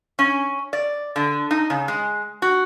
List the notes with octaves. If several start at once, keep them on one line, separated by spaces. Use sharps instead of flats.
C#4
D5
D3
D#4
C#3
G#3
F#4